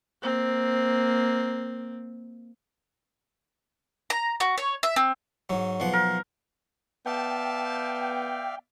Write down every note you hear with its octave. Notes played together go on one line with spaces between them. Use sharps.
A#3 C4
A#5
F#4
C#5
E5
C4
G#2 F#3
B1 F3 F#5
A#4
B3 D5 E5 F5 G5 A5